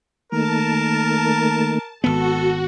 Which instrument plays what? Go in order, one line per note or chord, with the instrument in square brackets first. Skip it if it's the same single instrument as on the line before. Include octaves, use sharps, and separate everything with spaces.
[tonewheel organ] D#3 A3 A#3 [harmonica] A#4 [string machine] A5
[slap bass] G#1 B3 [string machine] F#4 [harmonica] A4